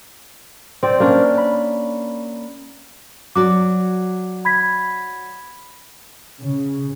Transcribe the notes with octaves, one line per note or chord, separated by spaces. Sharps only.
C4 C5 D5
A#3 C#4 D4
B5
F#3 F#4 D5 D6
B5 G#6 B6
C#3